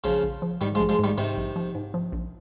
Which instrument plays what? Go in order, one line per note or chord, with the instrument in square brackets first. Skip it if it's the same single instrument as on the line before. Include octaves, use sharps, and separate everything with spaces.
[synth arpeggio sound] A#1 [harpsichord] C#3 F3
[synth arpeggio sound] A#1
F3
[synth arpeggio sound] G#2 [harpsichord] D#3 G3
[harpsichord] F3 G#3
[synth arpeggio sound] A#1
[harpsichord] F3 G#3
[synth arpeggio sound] G#2 [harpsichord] D#3 G3
[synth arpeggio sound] G#2 [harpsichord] C3 D#3
[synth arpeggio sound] A#1
F3
G#2
F3
A#1